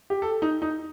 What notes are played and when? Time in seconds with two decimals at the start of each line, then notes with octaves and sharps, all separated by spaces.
0.10 G4
0.22 A4
0.42 D#4
0.62 D#4